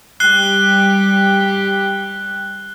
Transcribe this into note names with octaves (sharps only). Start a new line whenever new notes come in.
G3 G4 F#6 C7 G7